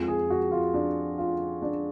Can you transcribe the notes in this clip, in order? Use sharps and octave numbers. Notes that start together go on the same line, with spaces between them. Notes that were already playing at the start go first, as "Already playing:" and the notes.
Already playing: F2 F3 G#3
G#4
F#4
F4
D4
F4
D4